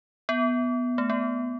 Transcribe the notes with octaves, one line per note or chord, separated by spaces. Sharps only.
B3
A3
B3